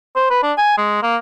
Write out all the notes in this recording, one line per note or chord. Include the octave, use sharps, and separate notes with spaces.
C5
B4
D4
G#5
G#3
A#3